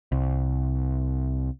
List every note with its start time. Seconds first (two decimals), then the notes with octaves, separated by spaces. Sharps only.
0.12 C2